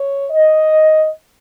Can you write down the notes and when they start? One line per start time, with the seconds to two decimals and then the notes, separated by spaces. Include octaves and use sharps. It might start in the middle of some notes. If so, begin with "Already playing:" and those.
Already playing: C#5
0.31 D#5